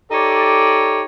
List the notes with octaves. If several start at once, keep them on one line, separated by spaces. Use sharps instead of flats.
D#4 G4 A4 C#5 D5